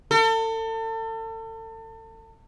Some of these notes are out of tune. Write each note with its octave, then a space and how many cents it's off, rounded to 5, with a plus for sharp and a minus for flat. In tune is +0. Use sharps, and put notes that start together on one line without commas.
A4 +35